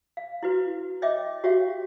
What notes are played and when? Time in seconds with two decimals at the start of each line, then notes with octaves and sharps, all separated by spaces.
0.17 F5
0.43 E4 F#4 B4
1.02 C#5 D#5 E5 G5 D6
1.44 F#4 G4 C#5 E5 F5 G5